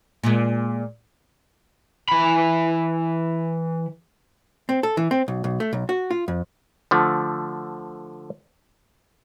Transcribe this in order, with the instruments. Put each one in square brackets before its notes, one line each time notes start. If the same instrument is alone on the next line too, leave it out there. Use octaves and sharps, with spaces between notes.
[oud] A#2 G#3
[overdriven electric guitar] E3 B5
[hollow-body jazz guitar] C4
A4
E3
C4
B1
B1
A3
B1
F#4
F4
F2
[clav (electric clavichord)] D3 F3 A3